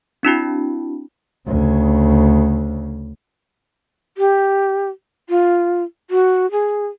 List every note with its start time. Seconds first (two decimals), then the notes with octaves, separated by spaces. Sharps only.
0.23 C4 D4 E4 F#4
1.47 D2 C#3
4.18 G4
5.30 F4
6.11 F#4
6.51 G#4